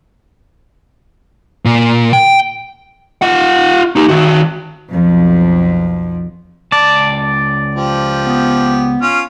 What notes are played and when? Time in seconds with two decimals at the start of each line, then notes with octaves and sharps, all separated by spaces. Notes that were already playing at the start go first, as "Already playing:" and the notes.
1.65 A#2
2.13 G5
3.22 F4 F#5
3.96 D#4 G4
4.09 D#3 F#4
4.90 B1 F2
6.72 C#2 D5 A5
7.75 F3 G4
8.25 B3
9.02 C#4 F4